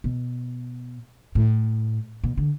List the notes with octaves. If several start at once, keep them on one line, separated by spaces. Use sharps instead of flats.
B2
A2
B2
D3